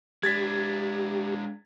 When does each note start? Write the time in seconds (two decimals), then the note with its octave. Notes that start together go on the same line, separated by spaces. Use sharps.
0.23 G#3 D4 G4 G#6 A6 B6